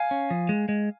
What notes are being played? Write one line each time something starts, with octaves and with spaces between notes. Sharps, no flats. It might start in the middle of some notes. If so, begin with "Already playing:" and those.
Already playing: F5 G#5
C#4
F3
G#3
G#3